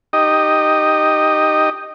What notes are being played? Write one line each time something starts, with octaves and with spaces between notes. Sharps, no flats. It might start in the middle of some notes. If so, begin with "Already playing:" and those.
D#4 G4 D#5